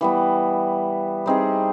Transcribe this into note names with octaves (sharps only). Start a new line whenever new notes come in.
E3 G3 B3
G3 C4 D#4 G#4